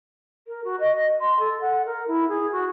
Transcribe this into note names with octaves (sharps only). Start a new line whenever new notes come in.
A#4
F#4
D#5
C6
A4
F#5
A#4
E4
G#4
F#4